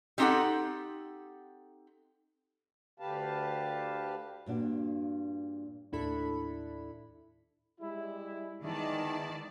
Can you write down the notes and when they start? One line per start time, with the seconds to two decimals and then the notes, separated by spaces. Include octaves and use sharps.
0.18 G3 C4 D#4 G4 A4 F#5
3.00 D2 D3 G4 B4 F5 A5
4.46 G2 A#2 D4 F#4
5.92 D#2 A2 D4 E4 A4 B5
7.80 G3 G#3 E4
8.64 D#3 G#3 B3 E4 D5 A5